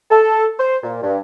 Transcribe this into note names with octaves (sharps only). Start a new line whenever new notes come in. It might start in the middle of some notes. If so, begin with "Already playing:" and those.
A4
C5
A#2
G2